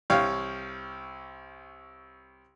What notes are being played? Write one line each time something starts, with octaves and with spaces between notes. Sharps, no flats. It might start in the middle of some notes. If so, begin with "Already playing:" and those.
C2 C#5 F5 G5